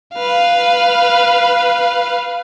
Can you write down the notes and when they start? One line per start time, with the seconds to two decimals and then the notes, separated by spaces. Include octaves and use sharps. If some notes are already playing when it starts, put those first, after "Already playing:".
0.14 B4 F5